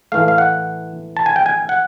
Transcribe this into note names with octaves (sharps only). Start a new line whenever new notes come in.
A2 E3 A3 F5
F5
F#5
A5
G#5
G5
G#5
F#5